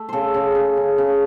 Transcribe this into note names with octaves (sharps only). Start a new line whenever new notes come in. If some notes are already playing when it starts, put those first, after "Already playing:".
Already playing: A3
C#3 A4 C5
C#3
C#3
C#3
C#3